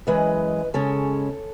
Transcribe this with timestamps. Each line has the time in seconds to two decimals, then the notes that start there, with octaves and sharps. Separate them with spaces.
0.07 F#2 E3 G#3 B4 D#5
0.74 C#3 G#3 C#4 A4 C#5